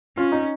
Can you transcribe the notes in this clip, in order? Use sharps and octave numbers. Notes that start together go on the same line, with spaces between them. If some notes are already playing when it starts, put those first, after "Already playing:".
C#4 F4
D#4